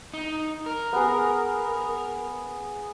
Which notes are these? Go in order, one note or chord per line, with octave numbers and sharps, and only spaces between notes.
D#4
A#4
B3 G#4